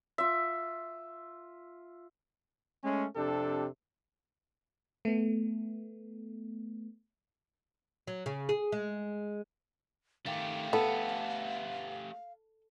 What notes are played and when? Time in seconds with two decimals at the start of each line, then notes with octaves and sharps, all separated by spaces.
0.18 F4 E5
2.83 G#3 A3 C#4
3.16 F2 C3 D4 G4 A4
5.05 A3 B3
8.07 F#3
8.26 C#3
8.49 G#4
8.72 G#3
10.26 D#3 A3 G4 F5
10.73 B3 A4